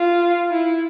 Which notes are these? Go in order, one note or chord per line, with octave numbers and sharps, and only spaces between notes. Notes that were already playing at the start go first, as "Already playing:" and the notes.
Already playing: F4
E4